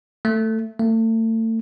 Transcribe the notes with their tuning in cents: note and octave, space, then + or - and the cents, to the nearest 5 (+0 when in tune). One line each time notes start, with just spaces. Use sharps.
A3 +15
A3 +35